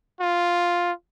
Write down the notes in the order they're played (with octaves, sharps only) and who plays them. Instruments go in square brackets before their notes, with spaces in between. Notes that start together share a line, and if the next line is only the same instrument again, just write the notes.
[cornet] F4